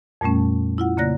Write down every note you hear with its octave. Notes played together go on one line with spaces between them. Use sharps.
F2 A#2 G3 A3 C#4
E4 F4 F#5
C#3 A#3 D5 F#6 A#6